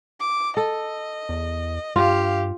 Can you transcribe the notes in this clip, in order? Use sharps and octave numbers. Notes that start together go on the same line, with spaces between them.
D6
A4 D#5
E2
G2 F4 G4 F5